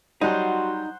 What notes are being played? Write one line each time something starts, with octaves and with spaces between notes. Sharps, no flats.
F#3 G3 D#4 F#4 C5 F#5 C6